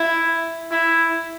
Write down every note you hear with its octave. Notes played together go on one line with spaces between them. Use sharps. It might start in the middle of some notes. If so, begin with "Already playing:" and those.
Already playing: E4
E4